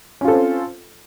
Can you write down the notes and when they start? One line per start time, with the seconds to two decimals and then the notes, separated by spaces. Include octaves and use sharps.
0.21 C#4
0.25 F4
0.28 A4
0.31 C4